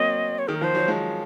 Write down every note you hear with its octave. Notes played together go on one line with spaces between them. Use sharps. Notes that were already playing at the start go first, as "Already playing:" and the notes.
Already playing: F#3 A#3 C4 D#5
C#5
D#3 G#4
A#4
F3 C5
F#3
F3 G#3